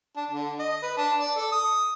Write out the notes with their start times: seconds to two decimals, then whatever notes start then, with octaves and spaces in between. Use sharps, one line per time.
0.16 D4
0.31 D3
0.59 D#5
0.82 B4
0.97 D4
1.20 D5
1.36 A4
1.52 D#6